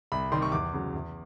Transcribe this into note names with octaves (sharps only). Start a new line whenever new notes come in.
C2 B5
C3 D#3 G3 C6
C#6
E2 D6
C#3 F#3
E2